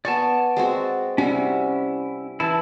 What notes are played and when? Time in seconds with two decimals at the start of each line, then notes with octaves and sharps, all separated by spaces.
0.05 B3 D5 G#5 A5 C#6
0.57 G#3 C4 F#4
1.18 C3 G3 C#4 E4 F#4
2.40 E3 E4 A5